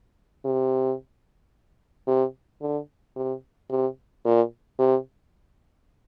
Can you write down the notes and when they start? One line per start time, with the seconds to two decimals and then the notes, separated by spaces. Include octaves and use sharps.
0.45 C3
2.07 C3
2.61 D3
3.16 C3
3.70 C3
4.25 A#2
4.79 C3